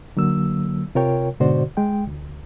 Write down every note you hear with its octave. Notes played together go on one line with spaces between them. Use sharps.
D3 F#3 A#3 E6
C3 F4 A#4 C#5 G5
G#2 B2 D3 F#4 C5 D5
G#3 G5
D2